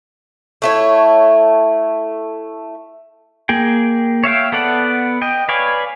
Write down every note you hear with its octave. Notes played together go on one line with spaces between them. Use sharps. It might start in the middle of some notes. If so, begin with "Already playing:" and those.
A3 E4 C#5
A#3 G#4 G5
C#5 E5 F5 G5
B3 A4 D5 F#5
D#5 G5
B4 C#5 D5 F5 G#5